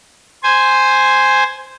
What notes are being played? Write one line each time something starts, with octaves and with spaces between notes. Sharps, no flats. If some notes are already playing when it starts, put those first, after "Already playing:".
C5 G#5